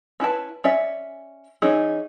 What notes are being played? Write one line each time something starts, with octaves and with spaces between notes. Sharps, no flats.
C#4 E4 B4 A5
C#4 D5 E5
E3 C#4 D#4 G#4